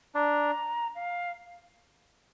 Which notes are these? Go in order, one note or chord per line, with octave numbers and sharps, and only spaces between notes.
D4 A#5
F5